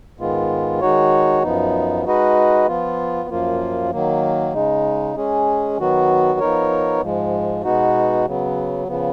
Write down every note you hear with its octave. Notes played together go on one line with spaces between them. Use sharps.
G#2 D#3 G#3 B3 F4
D#3 G#3 D#4 F#4 C#5
F#2 F3 B3 D#4
G#3 D#4 F#4 B4 D#5
F3 B3 F4
F#2 F3 A#3 F4
D#3 F#3 A#3
C#3 G#3 D#4
G#3 C#4 G#4
D#3 F#3 B3 F#4
F3 B3 D#4 A#4 C#5
G#2 F3 G#3
B2 G#3 B3 D#4 F#4
C#3 F#3 B3
C#3 F3 B3